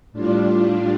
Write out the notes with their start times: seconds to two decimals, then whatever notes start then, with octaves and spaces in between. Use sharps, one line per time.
0.13 A2 G3 D4 F4